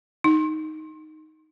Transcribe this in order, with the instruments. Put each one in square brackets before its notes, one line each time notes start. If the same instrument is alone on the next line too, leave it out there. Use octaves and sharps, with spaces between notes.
[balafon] D#4